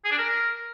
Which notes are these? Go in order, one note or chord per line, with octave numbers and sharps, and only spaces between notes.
G#4
D4
A#4